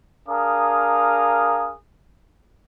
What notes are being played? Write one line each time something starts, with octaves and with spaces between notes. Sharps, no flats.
D4 G#4 A#4 F5 A#5 D#6